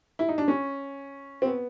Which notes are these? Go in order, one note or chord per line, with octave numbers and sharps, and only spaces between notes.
E4
D#4
D4
C#4
C4
B3